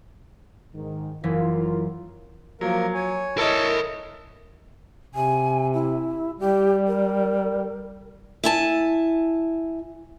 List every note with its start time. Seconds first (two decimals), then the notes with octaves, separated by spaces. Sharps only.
0.75 G#2 D#3
1.23 F#1 E3 F4 A#4 B6
2.61 F3 F#3 A#3 A#4
2.94 C#5 G#5
3.38 E4 A4 A#4 C#5 D#5 A5
5.15 C3 G#5
5.74 E4
6.39 G3 G4
6.87 A#4
8.44 E4 G#5 A5